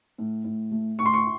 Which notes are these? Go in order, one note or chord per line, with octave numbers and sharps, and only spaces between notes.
A2
A2
A3
A2 C#6
C6
C#6